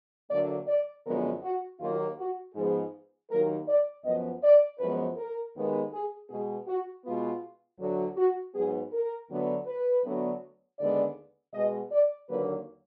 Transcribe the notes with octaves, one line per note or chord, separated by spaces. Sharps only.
D2 D3 F#3 A#3 D5
D5
F#2 D3 F3 G#3 B3 A#4
F#4
D#2 D#3 F#3 A#3 F4
F#4
G#2 F3 G#3 B3 G#4
D#2 D#3 F#3 A#3 A#4
D5
F#2 F3 B3 D#5
D5
F#2 F3 G#3 B3 B4
A#4
D#2 D#3 G#3 B3
G#4
B2 G#3 B3 G#4
F#4
B2 G#3 B3 F4
D2 D3 F#3
F#4
G#2 F#3 B3 G#4
A#4
D2 D3 F#3 B3
B4
D2 D3 F#3 B3
D#2 D3 G#3 B3 D5
B2 G#3 B3 D#5
D5
D#2 D3 F#3 A#3 B4